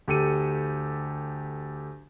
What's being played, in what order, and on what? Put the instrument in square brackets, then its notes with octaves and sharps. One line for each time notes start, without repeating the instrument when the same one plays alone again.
[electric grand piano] D2 G4 A4 C#7 D#7